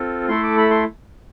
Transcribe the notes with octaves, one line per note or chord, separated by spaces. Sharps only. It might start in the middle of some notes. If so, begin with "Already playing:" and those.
Already playing: C4 F4 A4
A3 E4 A4 C6
D6
B5
C6